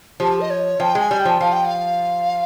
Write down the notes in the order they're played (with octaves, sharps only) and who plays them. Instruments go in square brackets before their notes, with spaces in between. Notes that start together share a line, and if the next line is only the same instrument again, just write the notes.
[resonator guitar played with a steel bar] F3 [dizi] G4
[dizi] D#5
C#5
[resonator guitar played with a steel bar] F3 [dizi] G5
[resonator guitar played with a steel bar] G#3 [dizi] G#5
[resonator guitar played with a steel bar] G3
[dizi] G5
[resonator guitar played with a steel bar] F3
[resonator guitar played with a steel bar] F3 [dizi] F5
[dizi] G5
F5